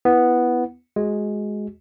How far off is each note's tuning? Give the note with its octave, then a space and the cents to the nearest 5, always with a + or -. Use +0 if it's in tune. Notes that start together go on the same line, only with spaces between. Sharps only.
B3 +0 E4 +0
G#3 +10 F#4 +5